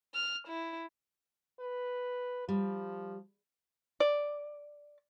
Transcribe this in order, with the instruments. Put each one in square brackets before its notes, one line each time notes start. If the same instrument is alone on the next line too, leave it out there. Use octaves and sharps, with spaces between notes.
[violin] F6
E4
[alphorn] B4
[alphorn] F3 [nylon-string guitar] G3
[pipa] D5